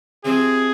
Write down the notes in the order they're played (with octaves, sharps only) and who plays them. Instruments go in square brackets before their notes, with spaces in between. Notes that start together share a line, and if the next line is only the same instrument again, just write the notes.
[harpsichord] C3 F3 C4 [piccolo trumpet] G#4